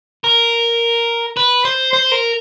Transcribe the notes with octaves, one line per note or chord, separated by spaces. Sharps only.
A#4
B4
C5
C5
A#4